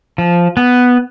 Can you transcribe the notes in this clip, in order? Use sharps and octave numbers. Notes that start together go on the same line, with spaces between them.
F3
B3